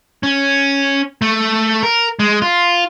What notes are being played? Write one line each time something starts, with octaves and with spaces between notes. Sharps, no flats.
C#4
A3
A#4
G#3
F4